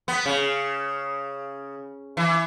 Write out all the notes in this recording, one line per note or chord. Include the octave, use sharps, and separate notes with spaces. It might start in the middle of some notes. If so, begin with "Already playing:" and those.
B3
C#3
E3